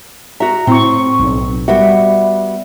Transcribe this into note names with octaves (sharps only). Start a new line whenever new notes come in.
F#4 E5 A#5
A2 C4 C#6
B1
G3 B3 F#4 E5